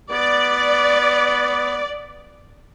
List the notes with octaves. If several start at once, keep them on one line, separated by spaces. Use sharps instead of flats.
B3 D5